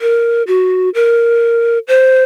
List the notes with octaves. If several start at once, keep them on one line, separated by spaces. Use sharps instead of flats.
A#4
F#4
A#4
C5